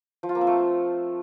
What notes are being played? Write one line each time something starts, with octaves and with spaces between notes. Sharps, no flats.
F3
F4
A#3
C4
A3